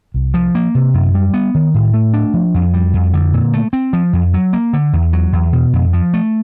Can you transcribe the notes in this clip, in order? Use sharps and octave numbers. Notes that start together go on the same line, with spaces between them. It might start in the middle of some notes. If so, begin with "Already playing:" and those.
C2
F3
A#3
C3
F#2
G3
B3
D#3
A2
A3
D4
F3
F2
G3
F2
D3
A#2
A3
C4
F3
F2
F#3
A#3
D3
E2
F#3
E2
B2
F2
F3
A3